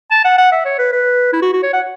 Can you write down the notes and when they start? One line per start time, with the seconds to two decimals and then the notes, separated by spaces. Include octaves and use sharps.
0.11 A5
0.25 F#5
0.38 F#5
0.52 E5
0.65 C#5
0.79 B4
0.92 B4
1.33 E4
1.43 F#4
1.53 F#4
1.63 C#5
1.73 F#5